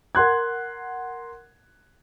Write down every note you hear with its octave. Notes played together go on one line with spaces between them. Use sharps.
A#4 F#5 C6 F#6 G#6